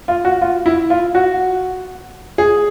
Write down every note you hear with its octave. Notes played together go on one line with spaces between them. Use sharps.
F4
F#4
F4
E4
F4
F#4
G#4